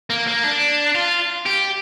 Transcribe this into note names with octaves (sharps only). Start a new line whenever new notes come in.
A#3
A#3
D4
F4
G4